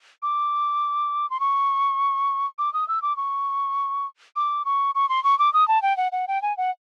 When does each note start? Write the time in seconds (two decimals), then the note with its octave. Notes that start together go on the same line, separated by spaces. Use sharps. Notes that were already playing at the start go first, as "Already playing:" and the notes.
0.22 D6
1.30 C6
1.40 C#6
2.58 D6
2.74 D#6
2.88 E6
3.02 D6
3.17 C#6
4.36 D6
4.65 C#6
4.95 C#6
5.09 C6
5.24 C#6
5.39 D6
5.53 D#6
5.68 A5
5.82 G5
5.97 F#5
6.12 F#5
6.28 G5
6.42 G#5
6.57 F#5